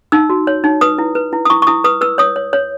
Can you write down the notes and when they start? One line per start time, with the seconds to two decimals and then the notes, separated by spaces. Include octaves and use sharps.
0.12 D#4 E6
0.30 F#4
0.47 C#5
0.64 D#4
0.81 B4 D#6
0.98 E4
1.15 B4
1.33 E4
1.45 D#6
1.50 E4 C#6
1.62 C#6
1.67 E4 D#6
1.84 B4 D#6
2.01 B4 E6
2.18 C#5 D#6
2.36 C#5
2.53 C#5